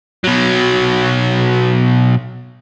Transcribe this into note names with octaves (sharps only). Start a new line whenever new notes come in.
B2 F#3